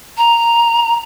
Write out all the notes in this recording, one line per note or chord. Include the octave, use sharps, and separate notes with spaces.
A#5